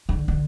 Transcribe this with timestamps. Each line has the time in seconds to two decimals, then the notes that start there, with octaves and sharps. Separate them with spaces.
0.09 D3
0.28 D3